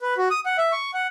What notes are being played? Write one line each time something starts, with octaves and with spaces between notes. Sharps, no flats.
B4
F#4
D#6
F#5
E5
C#6
F#5